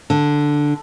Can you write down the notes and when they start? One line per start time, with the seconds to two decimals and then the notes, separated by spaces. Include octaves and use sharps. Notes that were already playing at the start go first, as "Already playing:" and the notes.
0.10 D3